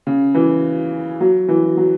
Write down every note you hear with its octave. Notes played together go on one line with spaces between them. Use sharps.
C#3
E3
F#3
E3
F#3